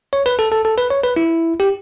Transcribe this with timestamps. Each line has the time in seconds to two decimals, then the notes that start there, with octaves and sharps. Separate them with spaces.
0.13 C#5
0.26 B4
0.39 A4
0.52 A4
0.65 A4
0.78 B4
0.90 C#5
1.04 B4
1.16 E4
1.60 G4